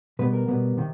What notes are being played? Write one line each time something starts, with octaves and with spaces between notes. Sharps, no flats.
B2 G3 B3 B4
A#4
B2 G3 B3
C3 D#3